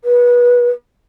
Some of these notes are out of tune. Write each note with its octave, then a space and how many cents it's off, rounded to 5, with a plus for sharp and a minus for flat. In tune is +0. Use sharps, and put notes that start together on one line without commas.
B4 -25